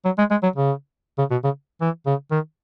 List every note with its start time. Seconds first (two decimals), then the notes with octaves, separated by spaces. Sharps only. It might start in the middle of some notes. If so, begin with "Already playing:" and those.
0.05 F#3
0.18 G#3
0.31 G#3
0.43 F#3
0.56 C#3
1.18 C#3
1.31 B2
1.44 C#3
1.81 E3
2.06 C#3
2.31 D#3